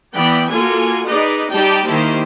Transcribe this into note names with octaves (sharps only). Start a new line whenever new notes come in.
E3 B3 D5 G5 B5
A#3 F4 F#4 A4 G#5
D#4 G#4 B4 D5 D#5
G3 D#4 G4 D5 G5 A5
D#3 A#3 E4 G4 C5